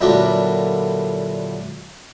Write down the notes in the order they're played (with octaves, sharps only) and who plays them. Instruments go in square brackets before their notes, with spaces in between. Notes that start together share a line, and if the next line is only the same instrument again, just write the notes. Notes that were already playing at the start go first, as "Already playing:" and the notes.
[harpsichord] A#2 D3 F#3 G3 D4 E4